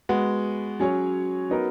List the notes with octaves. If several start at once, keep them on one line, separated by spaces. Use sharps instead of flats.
G#3 B3 F#4
F#3 C#4 G#4 C#5
F#3 B3 D#4 A#4